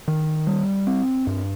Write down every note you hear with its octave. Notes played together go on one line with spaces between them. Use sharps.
D#3
G3
C4
G2